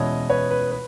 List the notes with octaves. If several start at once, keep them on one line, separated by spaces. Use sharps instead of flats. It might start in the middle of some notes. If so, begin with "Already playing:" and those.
Already playing: E2 B2 G#3 C#4 E4 C#5 D#5
B4 C#5
B4
B4